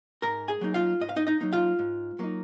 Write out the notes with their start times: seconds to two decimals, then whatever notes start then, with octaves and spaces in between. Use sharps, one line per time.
0.22 G#2 A#4 A#5
0.48 G#4 G#5
0.61 F#3 A#3 D#4
0.74 F4 F5
1.00 G#2 D#5
1.09 F5
1.16 D#4 D#5
1.27 D#4 D#5
1.40 F#3 A#3 D#4
1.53 F4 F5
1.79 G#2
2.19 F#3 A#3 D#4